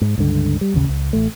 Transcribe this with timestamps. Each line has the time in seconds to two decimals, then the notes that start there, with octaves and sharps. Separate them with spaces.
0.01 G#2
0.18 C#2 G2 D3
0.61 G3
0.74 A1 D#2 C#3
0.89 C#2
1.13 A1 A3